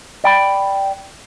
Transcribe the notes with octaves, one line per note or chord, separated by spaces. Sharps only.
D5 G5 B5